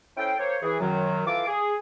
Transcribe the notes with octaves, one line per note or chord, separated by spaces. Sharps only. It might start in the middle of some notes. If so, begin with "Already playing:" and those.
C#4 E4 A4 C5 G5
A#3 C5 C#5
E3 G#4
F#2 D#3 F#3
E3 F4 A4 F5 D6
G#4